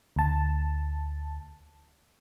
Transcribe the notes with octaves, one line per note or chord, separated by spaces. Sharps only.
D2 A5